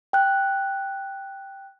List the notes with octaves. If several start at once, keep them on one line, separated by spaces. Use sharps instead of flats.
G5 F#6